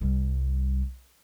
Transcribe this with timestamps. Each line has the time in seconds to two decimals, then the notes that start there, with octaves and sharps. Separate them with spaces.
0.01 C2 G3